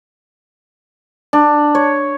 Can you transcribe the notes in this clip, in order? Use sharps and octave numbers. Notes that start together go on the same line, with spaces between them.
D4
C#5